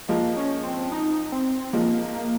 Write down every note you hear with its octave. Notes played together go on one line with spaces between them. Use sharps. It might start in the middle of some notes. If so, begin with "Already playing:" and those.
F3 G#3 A#3
C#4
C4
D#4
C4
F3 G#3 A#3